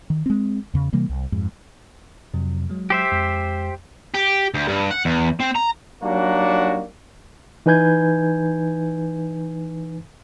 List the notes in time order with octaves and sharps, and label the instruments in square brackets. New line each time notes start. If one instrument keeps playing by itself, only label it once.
[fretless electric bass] D#3
G#3 C4
E2 C#3
C3 E3 G3 A#3
C2
F2 G#2
[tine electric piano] F2 C3 F#3
F#3 G#3
[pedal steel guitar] G4 C5 E5
[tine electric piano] F2 G#3
[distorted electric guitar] G4
D2
G2
F#5
E2
C4
A#5
[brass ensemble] F#3 G3 A#3 D4 D#4 F#4
[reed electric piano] E3 D#4 B4 G#5 G6 G#6